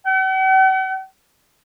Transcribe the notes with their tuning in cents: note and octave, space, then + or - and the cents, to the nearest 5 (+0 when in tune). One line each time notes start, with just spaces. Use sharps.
F#5 +45